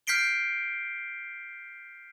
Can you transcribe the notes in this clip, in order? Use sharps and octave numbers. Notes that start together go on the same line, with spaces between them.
F6 G6 B6 C7 D7 G7